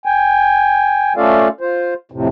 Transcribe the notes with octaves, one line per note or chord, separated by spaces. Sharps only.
G5 G#5
A3 C#4 F4 A4 D5 F5
F4 C5
F2 A2 C3